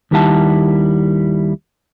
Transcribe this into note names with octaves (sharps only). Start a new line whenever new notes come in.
D#2 D#3 G3 E4 F#5 A5